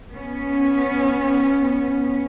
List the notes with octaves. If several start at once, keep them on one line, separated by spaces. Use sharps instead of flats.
B3 C#4